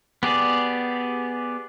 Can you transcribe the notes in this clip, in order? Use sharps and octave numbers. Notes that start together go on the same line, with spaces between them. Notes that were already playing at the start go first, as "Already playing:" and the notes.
B3 G4 G#4 D5